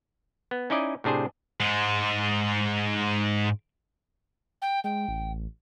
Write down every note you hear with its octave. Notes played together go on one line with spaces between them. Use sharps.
B3
C#4 D#4 E4 D5 D#5
A2 C3 D4 G#4 C5
G#2 G#3
G5
G#3 G5
A1